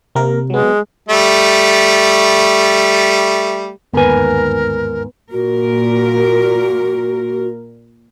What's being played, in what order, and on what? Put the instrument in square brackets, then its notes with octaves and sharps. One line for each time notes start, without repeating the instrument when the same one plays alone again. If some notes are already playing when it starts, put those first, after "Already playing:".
[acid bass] C3 [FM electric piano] A#3 A#4
[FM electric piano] F#3 B3 [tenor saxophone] G#3
[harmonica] G3 A3
[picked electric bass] G1 D#2 [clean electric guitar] G#2 G#5 [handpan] B3 B4 [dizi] A#4
[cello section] A#2 A#4 [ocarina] F#4